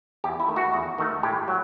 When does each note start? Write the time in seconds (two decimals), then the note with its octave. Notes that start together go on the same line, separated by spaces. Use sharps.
0.24 E2 G4
0.40 E4
0.48 D#3 A3
0.56 F#4
0.74 E2
0.98 D#3 A3
1.23 A2 G4
1.48 F#3